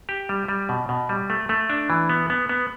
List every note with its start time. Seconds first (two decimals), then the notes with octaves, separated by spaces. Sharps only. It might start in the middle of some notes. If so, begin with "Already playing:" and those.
0.09 G4
0.29 G3
0.48 G3
0.69 B2
0.89 B2
1.09 G3
1.30 A3
1.49 A3
1.70 D4
1.90 E3
2.09 B3
2.30 B3
2.49 B3